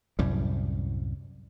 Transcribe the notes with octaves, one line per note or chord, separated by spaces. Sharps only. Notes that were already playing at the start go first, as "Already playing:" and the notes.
C2 F#2 A2 G3